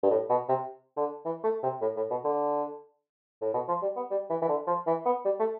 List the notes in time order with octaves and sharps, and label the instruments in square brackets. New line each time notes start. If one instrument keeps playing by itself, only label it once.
[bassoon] G2
A2
B2
C3
D3
E3
A3
C3
A2
A2
B2
D3
A2
B2
F3
G3
B3
G3
E3
E3
D3
F3
E3
B3
G3
A3